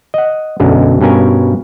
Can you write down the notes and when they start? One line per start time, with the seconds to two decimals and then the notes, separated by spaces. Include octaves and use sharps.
0.14 D#5 F#5
0.60 B1 F#2 D3 G#3
1.01 G2 B2 C#4 A#4 G#5